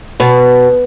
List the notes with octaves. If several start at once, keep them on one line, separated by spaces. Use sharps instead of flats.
B2